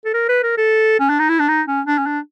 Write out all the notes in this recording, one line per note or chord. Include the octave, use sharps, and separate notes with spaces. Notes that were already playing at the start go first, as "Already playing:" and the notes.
A4
A#4
B4
A#4
A4
C#4
D4
D#4
E4
D4
D#4
C#4
D4
C#4
D4